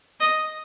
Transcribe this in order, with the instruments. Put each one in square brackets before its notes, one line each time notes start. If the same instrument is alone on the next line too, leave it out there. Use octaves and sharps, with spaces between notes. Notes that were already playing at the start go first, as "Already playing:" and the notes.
[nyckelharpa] D#5